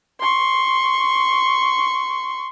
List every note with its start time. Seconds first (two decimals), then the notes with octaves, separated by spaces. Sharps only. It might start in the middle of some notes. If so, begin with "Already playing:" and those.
0.20 C6 C#6